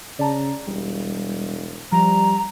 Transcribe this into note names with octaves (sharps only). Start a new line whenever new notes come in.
C#3 D5 A5 A#5
E1 G3
F3 G3 A#5